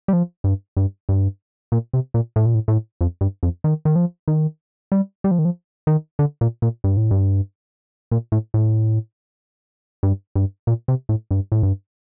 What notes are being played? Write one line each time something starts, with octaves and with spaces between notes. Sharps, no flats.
G3
F3
G2
G2
G2
A#2
C3
A#2
A2
A#2
A2
A2
F2
G2
F2
D#3
D#3
F3
D#3
G3
G3
F3
D#3
F3
D#3
D3
A#2
A#2
G2
A2
G2
A#2
A2
A2
G2
G2
A#2
C3
A2
G2
A2
G2